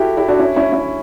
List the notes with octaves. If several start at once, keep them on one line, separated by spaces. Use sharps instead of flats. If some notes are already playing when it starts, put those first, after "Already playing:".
Already playing: E4 F#4 G4 A4
E4 G4
D4 F#4
C#4 E4
C#4 E4
C#4 E4